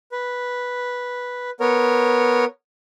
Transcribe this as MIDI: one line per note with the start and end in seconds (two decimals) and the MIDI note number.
0.12 1.50 71
1.60 2.45 59
1.60 2.45 70
1.60 2.45 73